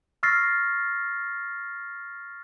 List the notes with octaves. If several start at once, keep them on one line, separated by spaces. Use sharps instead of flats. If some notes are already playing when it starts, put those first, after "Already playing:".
C#6 E6 F6 A6 A#6 C7